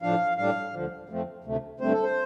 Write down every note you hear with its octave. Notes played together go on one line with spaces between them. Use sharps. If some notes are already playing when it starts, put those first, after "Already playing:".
A2 F3 D4 F5
A2 G3 D4 F5
D2 D3 F3
F2 F3 A3 C4
D2 C3 A3
G2 D3 A3 C4 C5
A4
C5